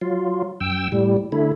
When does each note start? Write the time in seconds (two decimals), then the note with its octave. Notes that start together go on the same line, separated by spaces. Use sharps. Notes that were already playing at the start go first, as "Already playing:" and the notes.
0.01 F#3 F4
0.60 F#2 G5 E6
0.92 A2 G3
1.32 D3 A3 E4